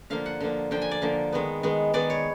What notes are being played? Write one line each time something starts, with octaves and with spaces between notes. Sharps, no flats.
D3 F3 A#3 F5
F#5
D3 F3 A#3
D3 F3 A#3 G5
G#5
D5
D3 F3 A#3
D#3 G#3 B3
D#3 G#3 B3
D#3 G#3 B3 D5
C#5